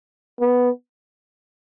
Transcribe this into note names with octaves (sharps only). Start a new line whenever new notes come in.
B3